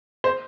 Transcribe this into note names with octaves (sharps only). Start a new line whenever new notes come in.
C5